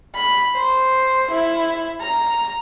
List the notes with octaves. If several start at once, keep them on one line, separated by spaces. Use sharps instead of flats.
B5
C5
E4
A#5